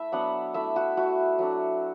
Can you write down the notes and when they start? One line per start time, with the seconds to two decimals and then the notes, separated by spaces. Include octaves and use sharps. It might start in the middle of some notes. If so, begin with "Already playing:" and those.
Already playing: A3 E4 E5
0.12 F#3 B3 D4 F#5
0.54 A3 E4 E5
0.76 F#4
0.97 A3 E4 F#4
1.39 F#3 A3 D4